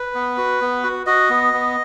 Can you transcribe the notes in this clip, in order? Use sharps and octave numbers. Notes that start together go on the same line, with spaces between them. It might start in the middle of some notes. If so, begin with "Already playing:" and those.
Already playing: B4
B3
F#4
B3
F#4
F#4 D#5
B3
B3